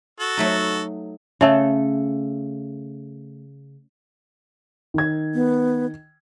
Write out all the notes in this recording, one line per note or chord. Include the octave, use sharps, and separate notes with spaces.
F#4 A4
F#3 A3 D#4
C#3 A3 A4
D#3 G#6
B3